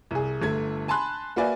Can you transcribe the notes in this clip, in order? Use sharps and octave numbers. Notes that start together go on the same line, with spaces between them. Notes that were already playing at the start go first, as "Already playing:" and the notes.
C2 G#4
G1 A3 G#6
G#5 A5 B5 C6 F#6
A#3 F#4 B4 D5 E5 G#5